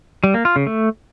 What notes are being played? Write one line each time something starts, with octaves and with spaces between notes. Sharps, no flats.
G3
A#3
F4
C#3
A3